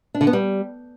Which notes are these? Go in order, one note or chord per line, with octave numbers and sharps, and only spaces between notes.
D4
D3
B3
G3